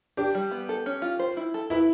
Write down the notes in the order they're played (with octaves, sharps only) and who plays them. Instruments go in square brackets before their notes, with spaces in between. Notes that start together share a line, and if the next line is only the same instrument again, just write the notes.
[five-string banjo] D4 [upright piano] G4
[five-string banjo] G3
B3
A4
C#4
F4
C5
E4
A4
[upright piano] E4 [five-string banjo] B4